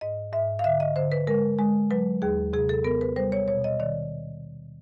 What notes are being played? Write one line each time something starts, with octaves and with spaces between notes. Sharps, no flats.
G#2 D#5
G#2 E5
F5
D3 E5
D#5
D3 C5
B4
G#3 A#4
G#3
F#3 B4
D#2 G#4
C3 G#4
A4
B3 A#4
B4
G3 C5
C#5
B2 C#5
D#5
D#3 D5